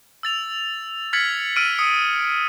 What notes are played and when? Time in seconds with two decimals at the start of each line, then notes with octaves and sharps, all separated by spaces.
0.23 E6 A6 F7
1.13 F6 G#6 A6 B6 C#7 F#7
1.56 E6 F6 D7 D#7
1.78 D#6 C#7